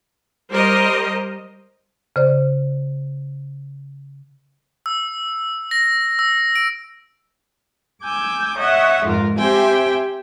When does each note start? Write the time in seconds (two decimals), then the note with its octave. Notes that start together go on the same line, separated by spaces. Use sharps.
0.53 G3 A#4 C5 D#5
2.16 C#3 C5 D5
4.86 E6
5.71 A#6
6.19 E6
6.55 D7
8.02 G#5 D6 E6 G6
8.57 C#5 D#5 E5 F#5
9.04 F2 G#2 F4 A#4
9.38 C4 G4 C5 E5 G5 G#5